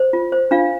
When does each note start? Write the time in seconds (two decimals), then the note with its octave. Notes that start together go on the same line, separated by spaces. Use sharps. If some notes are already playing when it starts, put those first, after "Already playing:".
Already playing: C5
0.13 F4
0.32 C5
0.51 D4 F4 F5